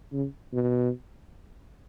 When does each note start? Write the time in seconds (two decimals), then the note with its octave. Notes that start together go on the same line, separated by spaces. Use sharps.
0.13 C#3
0.53 B2